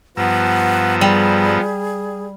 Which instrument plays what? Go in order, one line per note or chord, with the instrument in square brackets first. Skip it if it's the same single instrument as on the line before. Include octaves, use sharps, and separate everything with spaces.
[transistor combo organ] G2 A#5 E6 [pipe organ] F3 B3 [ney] F#5
[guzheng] G3 [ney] G#4